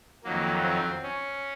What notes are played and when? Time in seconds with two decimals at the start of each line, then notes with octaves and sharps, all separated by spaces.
0.24 F2 D#3 F#3 A#3
0.63 C4
1.03 C#4